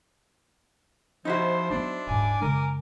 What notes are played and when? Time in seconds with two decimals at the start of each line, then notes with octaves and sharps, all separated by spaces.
1.25 F3 D#4 E4 F#4 C5
1.70 F#3 G#3 B3 D4
2.07 D#1 G#2 G#5 D6
2.42 F#2 C#3 G#3 A#4